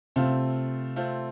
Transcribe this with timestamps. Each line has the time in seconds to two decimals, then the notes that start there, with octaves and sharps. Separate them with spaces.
0.16 C3 A3 C4 F4
0.96 A3 C4 F4